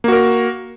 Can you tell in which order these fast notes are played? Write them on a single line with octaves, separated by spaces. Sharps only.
A#3 F#4 A#4